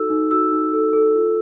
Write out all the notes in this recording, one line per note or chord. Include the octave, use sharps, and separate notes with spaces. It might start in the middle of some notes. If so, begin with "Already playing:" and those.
Already playing: D#4 F#4 A4 E6
D#4
F#4 E6
D#4
A4
A4
F4